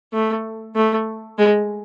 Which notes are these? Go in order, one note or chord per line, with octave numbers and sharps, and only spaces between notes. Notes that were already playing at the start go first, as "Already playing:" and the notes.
A3
A3
G#3